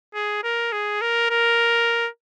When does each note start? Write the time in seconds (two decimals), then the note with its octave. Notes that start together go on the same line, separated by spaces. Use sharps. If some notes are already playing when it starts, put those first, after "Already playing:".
0.14 G#4
0.43 A#4
0.72 G#4
1.01 A#4
1.30 A#4